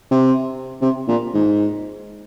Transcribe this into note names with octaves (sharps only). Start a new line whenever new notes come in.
C3
C3
A#2
G#2